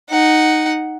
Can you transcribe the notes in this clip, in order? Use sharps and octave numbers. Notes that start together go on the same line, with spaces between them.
D#4 F#5